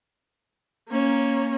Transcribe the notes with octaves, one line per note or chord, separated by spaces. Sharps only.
A#3 C#4